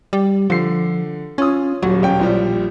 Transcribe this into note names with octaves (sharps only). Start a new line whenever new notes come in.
G3
D3 F3 C7
C#4 F4 D#6
D#1 F#3
E1 C#4 G5
A#1 F3 G3